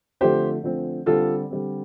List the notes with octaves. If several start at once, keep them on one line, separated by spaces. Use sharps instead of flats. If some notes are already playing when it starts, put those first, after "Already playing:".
D3 F3 A3 C4 G4 C5
D3 F3 A3 C4
D3 G3 C4 F4 A4
D3 G3 C4